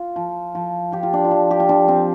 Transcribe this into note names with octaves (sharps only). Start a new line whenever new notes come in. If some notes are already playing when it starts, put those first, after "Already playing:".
Already playing: F4
F3
F3
F3 G4
F4
D4
F4
F3
G4
F4
F3 D4
C4